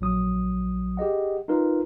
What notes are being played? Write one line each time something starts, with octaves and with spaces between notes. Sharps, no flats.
A#1 F#3 D#6
G4 G#4 D#5 F#5
D#4 F4 A#4 B4